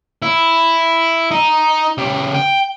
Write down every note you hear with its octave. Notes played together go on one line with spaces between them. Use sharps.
E4
D#4
C#3 G4
G5